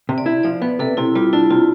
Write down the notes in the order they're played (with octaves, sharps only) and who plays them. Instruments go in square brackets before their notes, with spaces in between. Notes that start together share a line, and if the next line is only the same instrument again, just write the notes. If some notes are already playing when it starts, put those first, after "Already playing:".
[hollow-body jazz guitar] C3
[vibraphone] D5
[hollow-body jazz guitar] E4
[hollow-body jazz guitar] F3 [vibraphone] D5
[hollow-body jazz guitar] B3 [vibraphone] B4
[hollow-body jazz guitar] C3 [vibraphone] A4
[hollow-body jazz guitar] C3 [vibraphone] E4
[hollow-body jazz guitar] G3 [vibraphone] F4
[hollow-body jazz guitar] D4 [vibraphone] E4
[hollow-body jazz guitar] C3 [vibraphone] F4